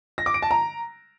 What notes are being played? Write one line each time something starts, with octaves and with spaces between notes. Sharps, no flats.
A#6
D6
D7
A5
A#5